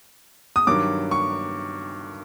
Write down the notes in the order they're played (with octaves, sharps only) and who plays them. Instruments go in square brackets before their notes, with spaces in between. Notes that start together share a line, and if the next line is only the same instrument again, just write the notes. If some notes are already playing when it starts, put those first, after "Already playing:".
[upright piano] D#6
G2 D#3 F#3 D6
C#6